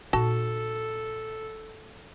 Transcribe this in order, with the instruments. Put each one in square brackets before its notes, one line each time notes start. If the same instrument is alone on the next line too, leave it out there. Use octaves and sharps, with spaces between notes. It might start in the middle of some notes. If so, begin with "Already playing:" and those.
[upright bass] A#2 D#4 [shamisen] F#4 A5 [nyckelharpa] A4